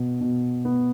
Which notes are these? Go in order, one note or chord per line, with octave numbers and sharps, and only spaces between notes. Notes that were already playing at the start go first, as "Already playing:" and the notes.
Already playing: B2
B2
B3